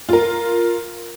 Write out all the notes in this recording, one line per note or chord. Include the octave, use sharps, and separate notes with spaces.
F4 A#4